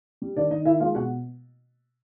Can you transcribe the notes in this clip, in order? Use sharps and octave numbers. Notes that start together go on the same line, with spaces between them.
G3
D#3 D4 D5
D#3 D#4 D#5
D#3 E4 E5
G#3 F4 F5
B2 F#4 F#5